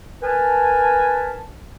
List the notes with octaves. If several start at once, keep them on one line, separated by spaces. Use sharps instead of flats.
A#4 B4 G#5 A5